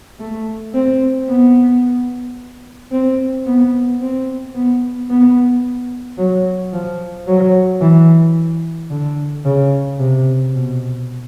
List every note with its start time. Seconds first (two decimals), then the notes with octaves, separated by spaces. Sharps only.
0.20 A3
0.74 C4
1.29 B3
2.92 C4
3.46 B3
4.01 C4
4.55 B3
5.10 B3
6.18 F#3
6.73 F3
7.27 F#3
7.81 E3
8.90 D3
9.45 C#3
9.99 C3
10.53 B2